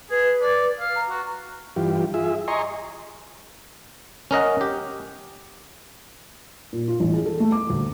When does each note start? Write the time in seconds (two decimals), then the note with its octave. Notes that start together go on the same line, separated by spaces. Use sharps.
0.11 G#4 B4
0.41 D5
0.79 F5
0.96 A#5
1.10 F#4
1.76 G2 E3 F4 G4
2.14 F4 G#4 E5
2.48 D#5 G#5 A#5 C6 C#6
4.31 C#4 A#4 D#5 F#5
4.61 G4
6.73 A#2
6.88 F4
7.00 A1
7.14 G#4
7.26 A4
7.40 A3
7.52 D6
7.70 D2